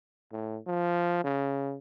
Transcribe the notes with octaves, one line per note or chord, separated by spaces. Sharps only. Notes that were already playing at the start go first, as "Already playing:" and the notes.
A2
F3
C#3